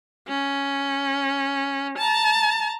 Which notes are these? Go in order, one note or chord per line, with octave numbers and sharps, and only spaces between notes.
C#4
A5 A#5